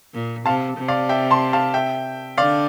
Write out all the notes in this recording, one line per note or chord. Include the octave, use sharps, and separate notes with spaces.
A#2
C3 F5 A5
C3
D5 F5
E5 G5
A5 C6
F5 A5
E5 G5
D3 D5 F5